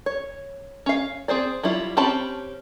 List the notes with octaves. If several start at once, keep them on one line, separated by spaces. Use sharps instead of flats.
C#5
C#4 F5
C4 G#4 C5 D5
F#3 G3 E4 F4
C4 C#4 G4 A5 B5